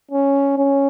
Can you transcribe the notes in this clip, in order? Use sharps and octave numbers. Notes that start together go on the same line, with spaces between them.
C#4
C#4